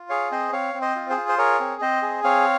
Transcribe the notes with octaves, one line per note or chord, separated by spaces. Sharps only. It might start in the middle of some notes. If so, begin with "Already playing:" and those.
Already playing: F4
G#4 C#5 F5
C4 C5 D#5
C4 C#5 F5
C4
C5 D#5
F4
G#4 C5
F4
C5
G#4 A#4 C#5
C4
C4 C5 D#5
G#4
C4 C#5 F5